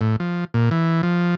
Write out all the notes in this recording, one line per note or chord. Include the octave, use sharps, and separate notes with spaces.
A2
F3
A#2
E3
F3